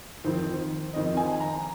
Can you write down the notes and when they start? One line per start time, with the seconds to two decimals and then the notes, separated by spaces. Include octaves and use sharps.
0.24 F2 D#3 C4
0.93 F2 D#3 C4 D#5
1.17 G#5
1.40 A#5